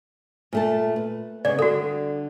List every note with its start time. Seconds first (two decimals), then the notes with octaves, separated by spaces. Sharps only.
0.53 A#2 A3 A5
0.96 B4
1.45 C#3 B3 D5
1.59 D3 G3 F#4 A4